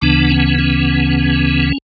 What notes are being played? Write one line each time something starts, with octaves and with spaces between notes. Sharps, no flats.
D2 C#3 E3 B3 D4
C#4
C#4